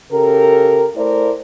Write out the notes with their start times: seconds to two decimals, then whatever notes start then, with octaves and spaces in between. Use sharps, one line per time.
0.12 C#3 G4 A4 A#4
0.96 A3 E4 A#4 C5 D5